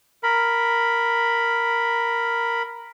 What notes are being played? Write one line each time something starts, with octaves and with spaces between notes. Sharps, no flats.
A#4 B5